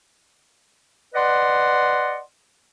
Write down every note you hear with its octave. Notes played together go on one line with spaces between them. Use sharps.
B4 D5 D#5 F#5 C6